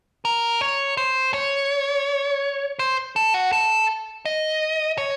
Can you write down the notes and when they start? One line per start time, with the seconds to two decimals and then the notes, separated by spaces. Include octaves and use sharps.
0.25 A#4
0.61 C#5
0.97 C5
1.34 C#5
2.79 C5
3.16 A4
3.34 F#4
3.53 A4
4.25 D#5
4.98 C#5